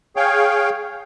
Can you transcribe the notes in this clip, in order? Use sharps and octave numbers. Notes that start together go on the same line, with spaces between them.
G#4 C#5 F5 G5